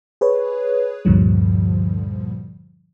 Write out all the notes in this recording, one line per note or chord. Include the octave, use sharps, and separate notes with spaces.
G#4 B4 C#5
D2 G2 A#2 D3 F3 G3